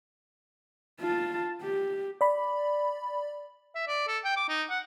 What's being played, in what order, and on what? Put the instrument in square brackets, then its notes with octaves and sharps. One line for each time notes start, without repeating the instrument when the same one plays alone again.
[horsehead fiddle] F4 A5
G4
[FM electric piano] D5 B5
[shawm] E5
D5
A4
G5
D6
D#4
F#5